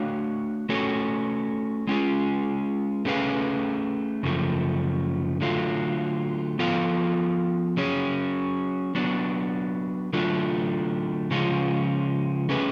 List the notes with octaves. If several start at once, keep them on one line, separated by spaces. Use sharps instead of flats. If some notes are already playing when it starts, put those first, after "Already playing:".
Already playing: A3 D4 F#4 C#5 F5
A3 C#4 F#4 A4 C#5
G#3 C#4 F4 G#4
A3 C#4 G#4 B4 F5
F#2 C#3 F3 A3
D3 F#3 A3 F4
F3 B3 F4 A4 F5
F#3 C#4 G#4 C#5
F#3 B3 D4
D3 F#3 A3 D4 F4
C#3 F3 G#3 C#4 F4
A3 C#4 G#4 B4